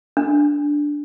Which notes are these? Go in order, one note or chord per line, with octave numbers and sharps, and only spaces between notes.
D4